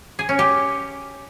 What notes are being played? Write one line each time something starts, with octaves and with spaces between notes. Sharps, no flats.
G#4
C#4
G4